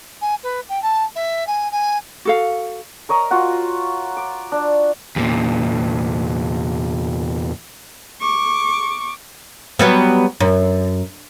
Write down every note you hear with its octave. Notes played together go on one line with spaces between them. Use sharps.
G#5
B4
G5
A5
E5
G#5
G#5
F#4 A4 F5
A#4 C#5 D#5 A#5
F4 F#4 F#5
D6
D4
E2 A#2
C#6 D6
F#3 G3 B3
F#2